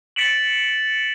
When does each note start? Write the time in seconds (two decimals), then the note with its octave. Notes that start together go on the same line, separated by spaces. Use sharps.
0.16 A6 B6 C#7 D7 E7 F#7